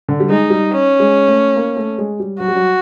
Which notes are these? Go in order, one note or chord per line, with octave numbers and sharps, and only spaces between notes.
D3
G3
G#3 D#4
G3
C#4
G#3
A3
A#3
A3
G#3
G3
F#3 F#4
G3
F#3